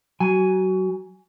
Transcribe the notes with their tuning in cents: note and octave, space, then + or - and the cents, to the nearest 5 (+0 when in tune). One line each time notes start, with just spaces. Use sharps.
F#3 +20 G#5 +0